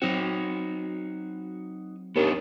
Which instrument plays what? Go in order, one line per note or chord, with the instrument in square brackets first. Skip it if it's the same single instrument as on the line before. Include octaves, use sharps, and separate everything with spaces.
[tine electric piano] F#3 C4 [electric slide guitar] D#4 F#4
[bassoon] D#2 [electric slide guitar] B3 D4 D#4